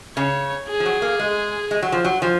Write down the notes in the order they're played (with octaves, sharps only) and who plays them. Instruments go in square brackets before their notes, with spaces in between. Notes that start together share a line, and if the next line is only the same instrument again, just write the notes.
[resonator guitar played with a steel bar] C#3 [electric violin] C#5
[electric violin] G#4
[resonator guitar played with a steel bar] F3
F#3
A#3
G#3
G#3
F#3
F3
F#3
F3